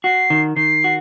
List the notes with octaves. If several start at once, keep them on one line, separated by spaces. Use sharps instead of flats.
F#4 C7
D#3
D#3 C7
F#4